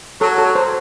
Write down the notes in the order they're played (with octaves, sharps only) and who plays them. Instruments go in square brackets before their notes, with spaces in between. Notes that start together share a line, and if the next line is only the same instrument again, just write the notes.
[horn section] F#3 [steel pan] A4
[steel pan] A4
C5